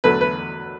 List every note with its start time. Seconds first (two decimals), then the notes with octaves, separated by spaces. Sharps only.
0.04 E2 D3 F#3 A3 B4
0.21 B4